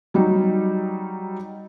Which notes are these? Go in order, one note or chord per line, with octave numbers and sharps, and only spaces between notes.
F#3 G3 D#4